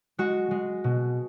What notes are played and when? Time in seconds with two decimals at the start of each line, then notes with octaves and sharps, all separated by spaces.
0.18 G#3 F#4
0.51 G#3
0.84 B2